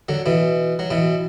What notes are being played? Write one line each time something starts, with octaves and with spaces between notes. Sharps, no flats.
D3 F#3
B2 E3
F#3
B2 E3